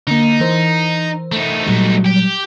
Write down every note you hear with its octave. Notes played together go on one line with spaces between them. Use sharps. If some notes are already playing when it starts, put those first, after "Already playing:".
D3 A#3 D#4
E3 A#4 C5
A3 D#4
A#2 F#3 G3
G4